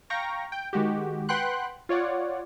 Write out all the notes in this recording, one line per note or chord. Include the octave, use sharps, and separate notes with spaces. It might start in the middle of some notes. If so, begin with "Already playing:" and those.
F5 G5 A#5 C#6 A#6
G5
D#3 G#3 F#4 G4
B4 F#5 G5 B5 C6 F#6
F4 C#5 D5 F#5